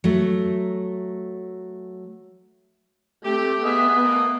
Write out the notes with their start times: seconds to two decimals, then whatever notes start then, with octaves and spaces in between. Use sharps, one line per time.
0.04 F#3 A3
3.24 A3 C4 G4
3.64 B3 G#4 D#5 E5
4.03 A3 A#3